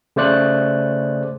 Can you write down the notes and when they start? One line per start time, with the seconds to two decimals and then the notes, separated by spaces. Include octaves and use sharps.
0.16 C#3 A3 C5 D5 F#6